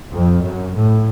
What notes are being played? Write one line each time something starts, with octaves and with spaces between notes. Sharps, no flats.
F2
F#2
A2